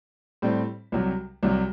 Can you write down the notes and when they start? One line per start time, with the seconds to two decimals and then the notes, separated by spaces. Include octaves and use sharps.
0.42 A2 G3 C4
0.92 C2 C3 F#3
1.43 C2 C3 F#3